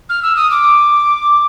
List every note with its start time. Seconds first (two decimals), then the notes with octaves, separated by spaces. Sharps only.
0.09 F6
0.22 E6
0.36 D#6
0.50 D6